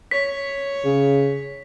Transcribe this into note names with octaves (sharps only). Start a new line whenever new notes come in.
C#5 B6
C#3